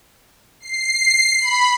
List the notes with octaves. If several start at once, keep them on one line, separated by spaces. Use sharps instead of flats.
C7
B5